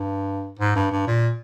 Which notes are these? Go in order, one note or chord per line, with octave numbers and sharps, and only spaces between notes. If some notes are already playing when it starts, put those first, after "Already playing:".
Already playing: G2
G#2
G2
G2
A#2